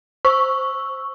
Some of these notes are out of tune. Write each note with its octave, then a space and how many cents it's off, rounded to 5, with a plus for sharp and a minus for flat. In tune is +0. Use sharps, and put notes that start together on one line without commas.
C5 +0 C#6 +0 E6 +0